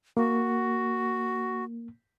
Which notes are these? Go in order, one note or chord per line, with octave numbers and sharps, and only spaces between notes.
A#3 F#4